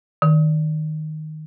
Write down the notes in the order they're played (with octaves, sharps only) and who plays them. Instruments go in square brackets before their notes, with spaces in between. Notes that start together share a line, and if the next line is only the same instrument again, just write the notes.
[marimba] D#3